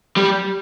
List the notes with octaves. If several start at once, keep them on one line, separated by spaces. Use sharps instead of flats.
G3